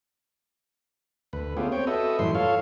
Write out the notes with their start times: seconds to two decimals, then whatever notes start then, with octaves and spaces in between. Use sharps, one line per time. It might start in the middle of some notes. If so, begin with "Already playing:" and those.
1.33 D2 B4
1.57 A3 B3 C#4 F4 G4 G#4
1.72 C4 C#5 G5
1.87 F#4 A4 B4 D#5 E5
2.19 F#2 A2 E3 G3 E4 C6
2.35 F4 A4 C#5 F5